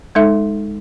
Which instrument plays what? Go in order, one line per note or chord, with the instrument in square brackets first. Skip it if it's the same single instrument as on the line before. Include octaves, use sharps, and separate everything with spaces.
[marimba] G#3 D#4 A4 E5